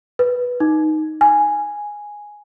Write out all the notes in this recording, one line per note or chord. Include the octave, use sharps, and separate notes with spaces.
B4
D#4
G#5